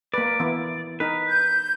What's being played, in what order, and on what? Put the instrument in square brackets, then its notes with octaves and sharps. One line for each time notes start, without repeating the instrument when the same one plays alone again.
[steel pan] A#3 B4 [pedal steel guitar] D5
[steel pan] E3 B3 E4
[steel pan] D#4 A#4 [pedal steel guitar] B4
[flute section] G6